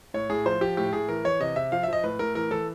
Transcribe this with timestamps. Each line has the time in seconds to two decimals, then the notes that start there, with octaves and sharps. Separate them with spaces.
0.14 A2 C#5
0.30 A2 G#4
0.46 F3 C5
0.61 F3 G4
0.77 A2 G4
0.93 A2 G#4
1.09 E3 A#4
1.24 E3 C#5
1.40 C3 D#5
1.56 C3 E5
1.72 F3 F5
1.83 E5
1.88 F3 D#5
2.04 A2 B4
2.19 A2 A#4
2.35 E3 A#4
2.51 E3 A4